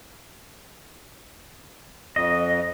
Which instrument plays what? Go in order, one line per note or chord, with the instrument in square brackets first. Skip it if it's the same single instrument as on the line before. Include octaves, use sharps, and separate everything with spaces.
[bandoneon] F2 [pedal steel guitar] D#5